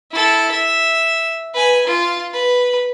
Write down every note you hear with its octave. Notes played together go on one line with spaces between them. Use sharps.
E4 A4
E5
B4 G#5
F4
B4